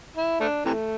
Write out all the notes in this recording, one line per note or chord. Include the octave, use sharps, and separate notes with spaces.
E4
A3 D4
C3 E3 A3